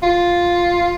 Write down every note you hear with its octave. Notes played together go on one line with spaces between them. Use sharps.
F4